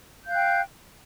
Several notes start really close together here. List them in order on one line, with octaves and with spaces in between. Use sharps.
G6 F5 F#6 G5